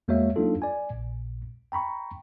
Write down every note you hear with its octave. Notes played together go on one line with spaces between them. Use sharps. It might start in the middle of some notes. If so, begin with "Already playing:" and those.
E2 G#3 A#3 F#4 C#5 E5
F#3 A#3 D4 D#4 F4 A4
D5 G#5
A#1 A#2
G5 A#5 B5 C#6